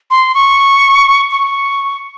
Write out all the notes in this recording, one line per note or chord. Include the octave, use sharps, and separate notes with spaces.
C6
C#6
C#6